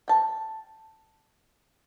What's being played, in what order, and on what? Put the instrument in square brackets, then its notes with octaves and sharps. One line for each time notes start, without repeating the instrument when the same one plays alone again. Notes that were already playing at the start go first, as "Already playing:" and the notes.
[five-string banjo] G5 A5